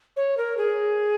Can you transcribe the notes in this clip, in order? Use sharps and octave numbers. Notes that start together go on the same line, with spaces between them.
C#5
A#4
G#4